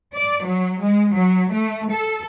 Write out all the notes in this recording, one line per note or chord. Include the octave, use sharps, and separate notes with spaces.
D5
F#3
G#3
F#3
A3
A4